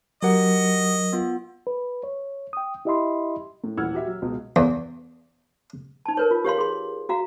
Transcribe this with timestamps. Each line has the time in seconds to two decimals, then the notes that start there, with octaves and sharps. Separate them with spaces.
0.23 F#3 G4 A#4 D#5 F#5
1.13 B3 F4
1.67 B4
2.04 C#5
2.53 G5 D#6
2.85 E4 G4 D#5 E5 B5 C6
3.64 A2
3.77 D#1 E3 F#5 E6 F6 G#6
3.93 F#4 G4 E5
4.07 F#3
4.22 C#2 B2
4.56 E2
6.06 D#4 A5
6.17 A#4 B4 C#5
6.31 F4
6.45 G4 C#5 F5 C6
6.58 G#4 C6
7.09 F#4 F5 A#5